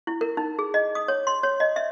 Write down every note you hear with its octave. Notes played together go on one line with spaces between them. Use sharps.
E4
A#4
D#4
G#4
D#5
D#6
C#5
C6
C#5
D#5
E5